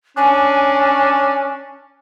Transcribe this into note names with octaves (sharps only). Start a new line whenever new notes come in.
C#4 D4 G#5